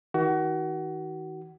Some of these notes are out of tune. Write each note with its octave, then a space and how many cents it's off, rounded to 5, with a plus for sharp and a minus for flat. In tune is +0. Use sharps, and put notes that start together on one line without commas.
D#3 +35 F#4 +30